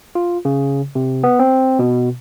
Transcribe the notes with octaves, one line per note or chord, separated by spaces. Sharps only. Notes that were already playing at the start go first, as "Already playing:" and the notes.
F4
C#3
C3
B3
C4
B2